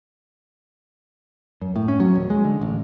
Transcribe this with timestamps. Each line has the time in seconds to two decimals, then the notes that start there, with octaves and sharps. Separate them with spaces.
1.62 F#2
1.76 A2
1.88 C#4
2.00 F#3
2.15 D#1
2.30 G#3
2.45 D3
2.61 A1